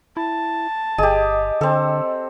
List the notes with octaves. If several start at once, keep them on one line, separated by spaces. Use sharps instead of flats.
E4 A5
G1 G4 G#4 D#5
D3 C4 A4